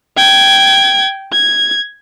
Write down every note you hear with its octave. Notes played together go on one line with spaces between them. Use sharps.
G5 G#6
G#6